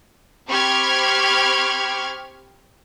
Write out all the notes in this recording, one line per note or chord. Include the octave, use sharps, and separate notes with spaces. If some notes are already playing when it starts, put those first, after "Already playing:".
C4 G4 B5 C#6 F6 G#6